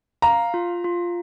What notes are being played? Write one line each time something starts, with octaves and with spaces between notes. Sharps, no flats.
F5 A#5
F4
F4